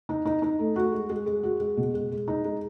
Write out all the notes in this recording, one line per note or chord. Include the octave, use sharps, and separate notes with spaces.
D#4
D#4
D#4
A3
F#4
G#3
G#3
G#3
F#4
G#3
B2
G#3
G#3
D#4
G#3